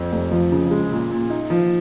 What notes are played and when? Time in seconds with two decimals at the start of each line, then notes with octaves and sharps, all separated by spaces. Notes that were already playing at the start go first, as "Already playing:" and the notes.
Already playing: F2
0.12 F1
0.32 F3
0.52 C#3
0.71 G#3
0.91 A#2
1.11 A#2
1.30 D#4
1.50 F3